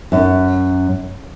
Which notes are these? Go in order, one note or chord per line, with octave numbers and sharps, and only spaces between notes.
F#2